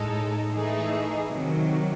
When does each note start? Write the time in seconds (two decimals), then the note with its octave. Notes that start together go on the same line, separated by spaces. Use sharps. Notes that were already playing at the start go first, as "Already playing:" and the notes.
Already playing: A2 G#3 D#4 A4
0.50 E3 A3 D#4 G#4
1.28 C3 D#3 F#3